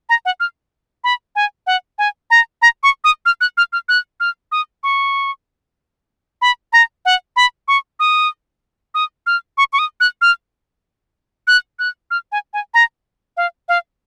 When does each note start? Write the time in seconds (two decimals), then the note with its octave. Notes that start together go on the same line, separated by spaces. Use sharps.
0.09 A#5
0.25 F#5
0.40 F6
1.04 B5
1.36 G#5
1.67 F#5
1.98 G#5
2.30 A#5
2.62 A#5
2.83 C#6
3.04 D#6
3.26 F6
3.41 F#6
3.57 F6
3.73 F6
3.89 F#6
4.20 F6
4.52 D#6
4.83 C#6
6.42 B5
6.73 A#5
7.05 F#5
7.36 B5
7.68 C#6
8.00 D#6
8.94 D#6
9.27 F6
9.58 C#6
9.73 C#6
9.79 D#6
10.00 F#6
10.21 F6
11.47 F#6
11.79 F#6
12.11 F6
12.32 G#5
12.53 G#5
12.74 A#5
13.37 F5
13.69 F5